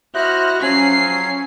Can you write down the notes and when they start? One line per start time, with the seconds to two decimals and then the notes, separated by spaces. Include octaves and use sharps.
0.14 E4 F#4 C5 D#5 F6 F#6
0.62 F3 F#3 C#4 G#5 C7